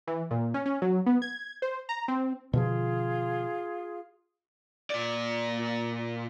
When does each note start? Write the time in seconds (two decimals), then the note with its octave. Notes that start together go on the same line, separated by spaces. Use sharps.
0.07 E3
0.31 A#2
0.54 C#4
0.66 C#4
0.82 F#3
1.06 B3
1.22 G#6
1.62 C5
1.89 A#5
2.08 C4
2.53 B2 D3 F3 F4 G#4
4.90 A#2 D5